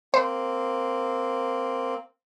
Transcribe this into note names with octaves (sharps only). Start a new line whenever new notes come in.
A#3 C4 C5